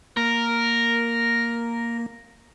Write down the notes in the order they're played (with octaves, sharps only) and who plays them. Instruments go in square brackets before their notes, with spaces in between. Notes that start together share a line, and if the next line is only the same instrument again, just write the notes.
[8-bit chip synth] A#3 [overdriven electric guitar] A#4